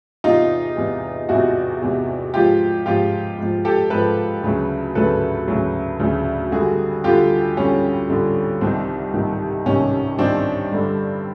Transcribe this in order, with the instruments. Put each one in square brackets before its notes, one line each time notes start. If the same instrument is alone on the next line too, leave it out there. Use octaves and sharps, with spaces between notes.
[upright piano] E2 C3 E3 D#4 F4
E2 C3 E3
E2 C3 E3 E4 F#4
E2 C3 E3
G#2 F3 F4 G4
G#2 F3 F4 G4
G#2 F3
G4 A4
G#2 F3 A4 B4
D2 C#3 F#3
D2 C#3 F#3 A4 B4
D2 C#3 F#3
D2 C#3 F#3
F2 D3 G3 F#4 G#4
F2 D3 G3 F4 G4
F2 D3 G3 C#4
F2 D3 G3
C2 C3 D#3 C4
C2 C3 D#3
C2 C3 D#3 C#4
C2 C3 D#3 C4 D4
G2 D3 G3